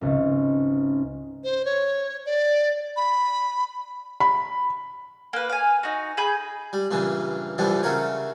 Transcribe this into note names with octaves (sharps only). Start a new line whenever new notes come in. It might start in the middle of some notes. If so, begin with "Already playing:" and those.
G#1 C#2
C5
C#5
D5
B5
B5
A#3 B4
F5 G#5
D#4 F#4
G#4 G#5 B5 G6
G3
G2 A#2 C#3 E3
C2 G2 E3 F3 G3 B3
C#3 A3 F#4 A#4 C#5